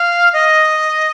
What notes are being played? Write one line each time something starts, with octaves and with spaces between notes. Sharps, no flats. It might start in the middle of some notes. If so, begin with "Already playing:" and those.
Already playing: F5
D#5